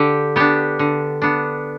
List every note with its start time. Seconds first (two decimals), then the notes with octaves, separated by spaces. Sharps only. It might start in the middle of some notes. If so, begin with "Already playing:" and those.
Already playing: D3 G4
0.36 B3 D4 G4
0.79 D3
1.22 B3 D4